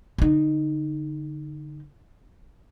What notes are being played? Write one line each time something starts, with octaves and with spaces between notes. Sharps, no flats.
D3 D#4